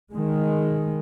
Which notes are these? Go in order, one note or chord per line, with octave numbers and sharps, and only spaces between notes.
D#3 G#3